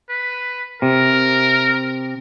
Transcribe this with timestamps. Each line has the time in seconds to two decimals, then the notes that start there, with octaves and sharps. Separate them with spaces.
0.10 B4
0.82 C3 A#4